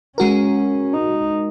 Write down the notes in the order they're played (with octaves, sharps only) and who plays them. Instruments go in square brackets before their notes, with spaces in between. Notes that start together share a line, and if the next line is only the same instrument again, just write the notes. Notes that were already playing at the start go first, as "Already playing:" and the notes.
[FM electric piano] G#3 F#4 A#4 [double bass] C#4
[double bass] D#4